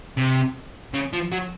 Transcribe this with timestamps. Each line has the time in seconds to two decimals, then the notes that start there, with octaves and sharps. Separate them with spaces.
0.18 C3
0.94 C#3
1.13 F3
1.32 F#3